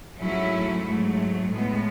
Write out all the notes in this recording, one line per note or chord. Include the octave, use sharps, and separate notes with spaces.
G#2 F#3 A3 C#4 E4
G#2 F#3 A3
A2 G#3 B3